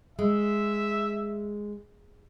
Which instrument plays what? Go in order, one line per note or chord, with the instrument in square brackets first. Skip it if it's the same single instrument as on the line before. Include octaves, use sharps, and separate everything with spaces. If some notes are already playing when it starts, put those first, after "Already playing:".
[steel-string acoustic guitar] G#3 [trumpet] E5